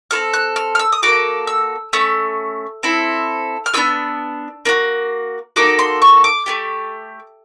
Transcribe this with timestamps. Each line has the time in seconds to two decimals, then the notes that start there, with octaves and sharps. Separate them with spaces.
0.11 C4 F4 A4 F6
0.34 F#6
0.56 F6
0.75 F6
0.79 E6
0.92 D#6
1.02 A#3 D#4 F#4 A4 D6
1.47 E6
1.93 A3 C#4 E6
2.83 C4 E4 A4
3.66 F6
3.74 B3 D4 F4 G#4 E6
4.65 A#3 D4 F#4
5.56 A#3 D#4 F#4 A4 D6
5.79 C6
6.02 C#6
6.24 D6
6.46 A3 D4 G4